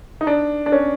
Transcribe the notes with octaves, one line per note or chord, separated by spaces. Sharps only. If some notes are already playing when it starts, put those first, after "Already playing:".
D#4
D4
D4
C#4